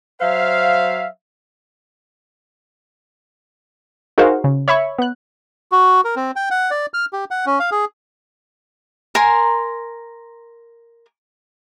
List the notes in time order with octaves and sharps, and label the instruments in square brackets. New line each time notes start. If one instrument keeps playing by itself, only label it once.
[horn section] F#3 C5 E5 F5
[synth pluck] D#4 F#4 G#4 A#4 C5 F5
C#3
C#5 E5 B5 C#6
B3 F#6
[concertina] F#4
A#4
C4
G5
F#5
D5
F6
G4
F#5
C#4
F5
G#4
[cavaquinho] A#4 G#5 A#5 C6